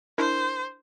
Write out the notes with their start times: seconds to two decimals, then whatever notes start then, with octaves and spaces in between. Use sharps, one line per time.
0.18 D4 E4 A#4 C5